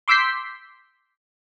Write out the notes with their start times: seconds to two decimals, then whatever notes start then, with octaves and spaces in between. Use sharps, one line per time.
0.08 C6 D6 E6 G6 B6 C7